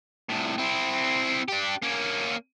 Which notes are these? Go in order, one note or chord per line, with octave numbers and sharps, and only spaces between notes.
C2 A2
C4 E4
D4 G4
A#3 C#4